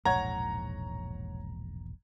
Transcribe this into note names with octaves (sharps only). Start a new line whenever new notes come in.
E1 A#1 G#2 C#5 F#5 A#5 G#6